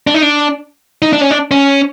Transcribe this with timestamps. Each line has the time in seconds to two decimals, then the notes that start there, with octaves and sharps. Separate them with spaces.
0.07 D4
0.14 D#4
0.22 D4
1.02 D#4
1.13 D4
1.21 C#4
1.31 D4
1.51 C#4